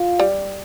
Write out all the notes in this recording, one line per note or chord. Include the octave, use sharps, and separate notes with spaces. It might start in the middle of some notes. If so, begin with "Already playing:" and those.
Already playing: F4
G3